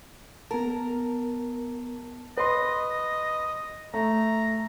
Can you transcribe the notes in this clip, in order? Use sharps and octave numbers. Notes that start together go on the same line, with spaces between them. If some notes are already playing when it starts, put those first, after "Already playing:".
B3 A#4 A5
B4 D#5 C6
A3 A#5